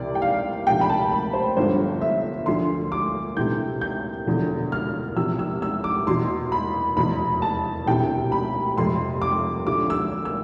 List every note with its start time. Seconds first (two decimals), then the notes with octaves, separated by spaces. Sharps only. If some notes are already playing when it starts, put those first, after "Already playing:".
Already playing: C2 C3 E3 D5
0.15 G5
0.22 F5
0.67 D2 C3 F3 G5
0.81 B5
0.90 A5
1.12 B5
1.33 C5
1.57 G1 G2 D3 F3 C5
2.01 E5
2.46 D2 D3 F3 C6
2.92 D6
3.37 D2 C3 E3 G6
3.81 G6
4.26 E1 E2 D3 F3
4.72 F6
5.16 E2 C3 F3 E6
5.39 E6
5.62 E6
5.84 D6
6.07 E2 B2 C6
6.52 B5
6.97 F1 E2 B2 B5
7.42 A5
7.86 E1 D2 C3 E3 G5
8.32 B5
8.77 F1 F2 C3 C6
9.22 D6
9.67 D2 D3 F3 D6
9.90 E6
10.25 E6